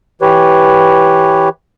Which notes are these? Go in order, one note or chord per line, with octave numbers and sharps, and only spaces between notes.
E3 G4 B4 C#5